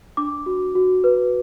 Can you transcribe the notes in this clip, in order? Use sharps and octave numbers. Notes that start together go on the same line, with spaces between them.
D4 D6
F#4
F#4
B4